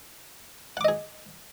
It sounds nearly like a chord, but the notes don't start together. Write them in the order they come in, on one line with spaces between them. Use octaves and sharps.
F#5 D6 D#5 G#4